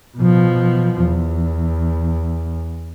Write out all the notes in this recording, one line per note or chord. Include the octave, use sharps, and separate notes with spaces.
B2 F3
E2